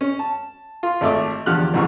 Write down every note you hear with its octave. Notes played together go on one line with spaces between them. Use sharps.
C#4
A5
F4
G#1 A3 E5 D6
E2 D3 F3 G4 F6 F#6
B1 E2 G#2 E3 F3 C#6